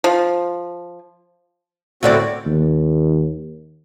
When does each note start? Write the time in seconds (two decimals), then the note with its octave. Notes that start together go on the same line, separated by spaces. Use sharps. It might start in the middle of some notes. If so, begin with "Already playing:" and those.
0.04 F3
2.03 D2 A2 C4 F#4 D5
2.46 D#2